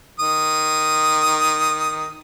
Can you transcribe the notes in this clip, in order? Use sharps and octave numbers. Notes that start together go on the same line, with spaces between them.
D#3 D#6